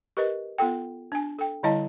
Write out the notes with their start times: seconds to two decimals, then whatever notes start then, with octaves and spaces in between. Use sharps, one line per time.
0.17 G4 A#4 B4 D#5
0.58 B3 F4 A4 G5
1.12 D4 G#5
1.39 A4 G5
1.63 D3 G3 E4 D#5 F5 A5